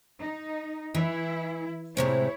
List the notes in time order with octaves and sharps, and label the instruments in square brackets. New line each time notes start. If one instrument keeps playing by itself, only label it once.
[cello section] D#4
[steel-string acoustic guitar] E3 [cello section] E4
[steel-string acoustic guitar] A2 C3 G#3 [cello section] E4 C#5 [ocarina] C5